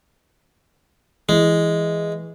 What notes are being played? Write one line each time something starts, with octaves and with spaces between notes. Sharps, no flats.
E3 G#3